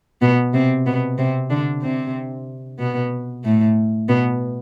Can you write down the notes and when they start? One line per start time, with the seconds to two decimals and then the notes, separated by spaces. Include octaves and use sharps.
0.22 B2 B3
0.53 C3 C4
0.86 B2 B3
1.18 C3 C4
1.50 D3 D4
1.82 C3 C4
2.79 B2 B3
3.44 A2 A3
4.09 B2 B3